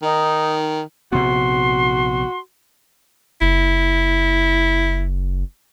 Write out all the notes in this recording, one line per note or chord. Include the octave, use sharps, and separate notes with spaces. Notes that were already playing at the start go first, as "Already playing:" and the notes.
D#3 D#4
A#1 C3 B3 F#4 C6
F#1 E4